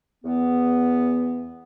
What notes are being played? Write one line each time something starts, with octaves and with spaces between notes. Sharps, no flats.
E2 B3